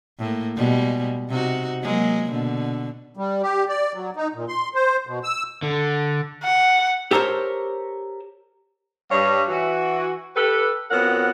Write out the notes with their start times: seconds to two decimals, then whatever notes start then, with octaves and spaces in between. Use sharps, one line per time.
0.19 A2 A#3
0.56 B2 G3 G#3
1.29 C3 D#4 F#4
1.83 F#3 G#3 A#3
2.30 B2 D3
3.17 G3
3.42 G4
3.68 D5
3.94 F#3
4.16 D#4
4.35 A#2
4.48 C6
4.75 C5
5.07 B2
5.24 E6
5.63 D3
6.44 F#5
7.11 G4 A4 A#4 C5 C#5
9.11 G2 G3 C#5
9.48 E3 F#4
10.36 G4 A4 B4
10.91 F2 B3 C#4 F#4 A#4 F#5